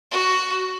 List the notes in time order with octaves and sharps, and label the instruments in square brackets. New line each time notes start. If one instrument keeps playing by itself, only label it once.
[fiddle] F#4